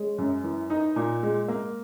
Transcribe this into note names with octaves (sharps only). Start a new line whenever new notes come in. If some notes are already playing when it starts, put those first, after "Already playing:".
Already playing: G#3 C#4
F#2
E3
D#4
A#2
G#3
A#3